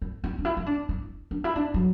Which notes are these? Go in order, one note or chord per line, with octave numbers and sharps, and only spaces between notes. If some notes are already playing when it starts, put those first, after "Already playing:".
E4
E4
D4
E4
E4
D4
E4
D4
E4
D4
F#3